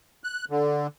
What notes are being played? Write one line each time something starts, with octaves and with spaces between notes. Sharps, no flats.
F#6
D3